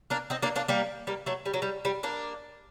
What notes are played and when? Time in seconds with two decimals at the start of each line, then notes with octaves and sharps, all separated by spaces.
0.10 A#3 D4
0.30 C4 D#4
0.42 A#3 D4
0.56 A#3 D4
0.68 G3 A#3
1.07 G3 A#3
1.26 F#3 A3
1.46 G3
1.54 F#3
1.62 G3
1.85 G3
2.03 A#3 D4